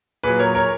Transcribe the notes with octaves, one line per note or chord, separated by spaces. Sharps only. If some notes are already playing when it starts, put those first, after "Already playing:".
A#2 F#3 G#4 B4
A#4 C#5
A#4 C#5